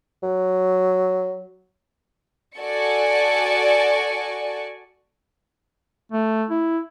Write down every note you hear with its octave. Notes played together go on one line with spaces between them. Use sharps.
F#3
F#4 A4 D5 G#5 C#6 C#7
A3
E4